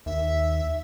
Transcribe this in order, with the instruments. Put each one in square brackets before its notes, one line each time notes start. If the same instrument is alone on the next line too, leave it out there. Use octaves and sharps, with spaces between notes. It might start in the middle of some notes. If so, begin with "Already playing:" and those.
[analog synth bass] D#2 [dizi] E5